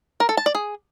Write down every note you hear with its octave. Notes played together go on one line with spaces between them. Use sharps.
A#4
A4
A5
D5
G#4